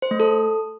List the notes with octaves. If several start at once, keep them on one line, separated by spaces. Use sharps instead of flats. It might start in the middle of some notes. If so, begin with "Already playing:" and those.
C5
A3
A4